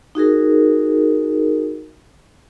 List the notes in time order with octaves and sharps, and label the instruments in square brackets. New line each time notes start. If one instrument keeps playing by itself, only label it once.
[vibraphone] D#4 F#4 G#4 A#4